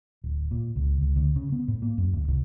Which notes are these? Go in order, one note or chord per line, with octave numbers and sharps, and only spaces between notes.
D1
A#2
C#2
C#2
D2
C#3
B3
A2
A#3
F#2
D1
C2